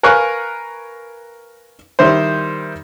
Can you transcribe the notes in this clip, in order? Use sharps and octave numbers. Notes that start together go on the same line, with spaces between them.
A#4 B4 F5 G#5 C#6 F#6
D#3 G3 E4 C5